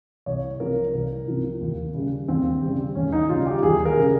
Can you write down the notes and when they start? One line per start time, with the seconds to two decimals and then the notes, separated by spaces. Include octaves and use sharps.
0.26 C2 C#5
0.60 C3 F3 A#4
0.94 C2 A#4
1.28 C3 F3
1.61 D#2
1.95 C#3 G3
2.28 D#2 C4
2.62 C#3 G3
2.95 D#2 C#4
3.12 D#4
3.29 C#3 G3 F4
3.46 G4
3.63 D#2 G#4
3.85 A#4
3.96 C#3 G3